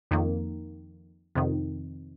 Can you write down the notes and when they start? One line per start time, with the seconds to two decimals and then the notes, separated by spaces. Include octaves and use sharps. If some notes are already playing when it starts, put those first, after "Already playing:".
0.11 F2 D#3 A#3
1.35 F2 C3 D#3